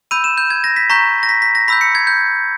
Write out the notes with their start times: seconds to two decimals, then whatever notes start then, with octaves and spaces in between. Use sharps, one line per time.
0.11 B5 E6 G6 D#7
0.24 E7
0.38 G6
0.50 G#6
0.64 A#6
0.76 B6
0.90 A#5 C#6 G6 B6
1.23 A#6
1.29 B6
1.42 B6
1.55 A#6
1.68 B5 E6 G6 B6
1.81 C#7
1.95 G#6
2.07 G6